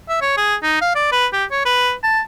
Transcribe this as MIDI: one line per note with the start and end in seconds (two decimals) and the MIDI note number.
0.09 0.20 76
0.21 0.33 73
0.37 0.55 68
0.63 0.79 63
0.81 0.95 77
0.95 1.11 74
1.12 1.27 71
1.33 1.45 67
1.51 1.63 73
1.65 1.93 71
2.03 2.20 81